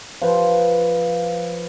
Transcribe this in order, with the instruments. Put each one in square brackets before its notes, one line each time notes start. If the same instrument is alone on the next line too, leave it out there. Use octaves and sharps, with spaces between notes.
[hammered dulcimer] F3 B4